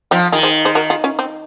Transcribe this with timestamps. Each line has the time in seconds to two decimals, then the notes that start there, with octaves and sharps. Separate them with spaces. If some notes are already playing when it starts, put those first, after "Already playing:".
0.11 F3 C4 D#4
0.32 D#3 F4 G#4
0.43 G#4 C5
0.65 G#4 C5
0.75 F#4 A#4
0.90 F4 G#4
1.04 C#4 F4
1.19 C4 D#4